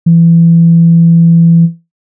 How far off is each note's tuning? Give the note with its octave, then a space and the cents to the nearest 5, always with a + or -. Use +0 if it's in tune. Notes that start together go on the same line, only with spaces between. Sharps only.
E3 +25